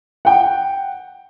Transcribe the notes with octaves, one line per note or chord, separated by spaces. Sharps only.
F#5 G5